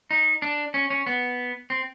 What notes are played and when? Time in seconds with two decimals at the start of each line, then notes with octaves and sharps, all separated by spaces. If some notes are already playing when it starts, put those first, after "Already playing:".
0.11 D#4
0.42 D4
0.74 C#4
0.90 C#4
1.07 B3
1.70 C4